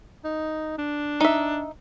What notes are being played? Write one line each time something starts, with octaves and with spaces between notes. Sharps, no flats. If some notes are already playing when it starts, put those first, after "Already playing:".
D#4
D4
D#4 E5